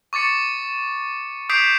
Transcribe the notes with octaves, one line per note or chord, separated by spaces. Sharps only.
C#6 D6 A6 C#7
D6 D#6 G6 B6 C7 D7